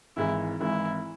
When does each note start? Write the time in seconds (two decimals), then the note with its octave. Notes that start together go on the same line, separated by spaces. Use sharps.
0.17 G#1 G#2 E3 G#3 E4
0.61 G#1 G#2 E3 G#3 E4